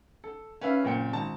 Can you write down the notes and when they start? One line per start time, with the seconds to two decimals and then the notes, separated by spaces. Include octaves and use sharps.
0.24 A4
0.61 C#4 B4 E5 F5
0.84 F#1 A#2 C4 G5 C#7
1.13 G#1 A5 A#5